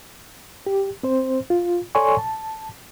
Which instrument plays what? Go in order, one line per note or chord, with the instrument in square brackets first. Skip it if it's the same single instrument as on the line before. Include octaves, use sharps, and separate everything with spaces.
[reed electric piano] G4
C4 C5
F4
A4 C#5 D5 G#5 C6 C#6
A5